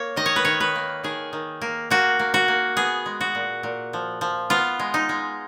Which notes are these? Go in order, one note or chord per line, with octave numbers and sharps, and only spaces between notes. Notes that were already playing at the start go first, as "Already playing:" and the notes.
Already playing: A#3 C#5
D#3 D#5
C#5
B4
D#3 C#5
B4
A#3
D#3 G#4
D#3
A#3
A#3 F#4
A#3
F#4
A#3
B3 G#4
G#3
F#4
A#2
A#2
F3
F3
B3 F4
G#3
D#4
G#3